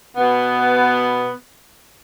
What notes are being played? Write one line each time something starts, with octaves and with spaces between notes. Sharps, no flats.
B2 B3